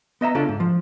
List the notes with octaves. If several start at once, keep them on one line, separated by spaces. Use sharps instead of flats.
B3 D#5 E5 A#5
C#3 C#4 D4 F4 A4
G#2
F3